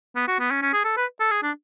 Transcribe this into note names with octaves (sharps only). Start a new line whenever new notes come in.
B3
F#4
B3
C#4
C#4
G#4
A4
B4
A4
G#4
D4